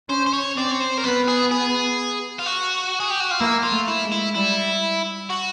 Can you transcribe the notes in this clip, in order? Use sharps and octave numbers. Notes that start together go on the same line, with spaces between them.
C#4 C5
C5
C#5
C4 D5
C#5
C5
A#4
B3 B4
G#4
G#4
F4
F#4
G#4
G4
F#4
F4
A#3 E4
F4
A3
E4
G#3
E4
G3 E4
F#4